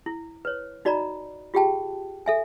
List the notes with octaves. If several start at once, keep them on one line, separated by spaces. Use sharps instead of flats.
E4
B4 C#5
D#4 F#4 D5 D#5 A#5 B5
F4 G4 G#4 G5 A5
A4 E5 G#5